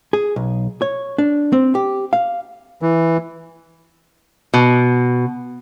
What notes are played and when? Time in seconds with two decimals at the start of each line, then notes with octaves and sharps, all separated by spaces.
0.13 G#4
0.36 B1
0.82 C#5
1.18 D4
1.53 C4
1.75 G4
2.13 F5
2.82 E3
4.54 B2